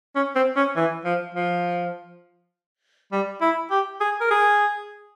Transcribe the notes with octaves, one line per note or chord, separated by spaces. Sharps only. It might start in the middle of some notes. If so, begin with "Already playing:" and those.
C#4
C4
C#4
E3
F3
F3
G3
E4
G4
G#4
A#4
G#4